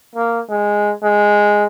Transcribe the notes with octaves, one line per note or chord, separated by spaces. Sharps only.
A#3
G#3
G#3